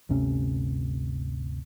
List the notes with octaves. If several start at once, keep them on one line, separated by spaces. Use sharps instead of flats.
G1 D2 C3 C#4